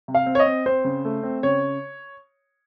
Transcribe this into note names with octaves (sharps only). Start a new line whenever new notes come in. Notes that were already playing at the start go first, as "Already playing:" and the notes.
C3
F5
C4
C#5
D#5
C4
C4 C5
C#3
A3
C4
C#3 C#5